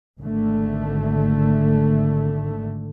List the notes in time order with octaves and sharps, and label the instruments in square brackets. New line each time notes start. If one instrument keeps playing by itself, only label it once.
[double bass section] G#1 D3 A3